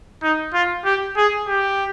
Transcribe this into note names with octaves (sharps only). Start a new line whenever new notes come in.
D#4
F4
G4
G#4
G4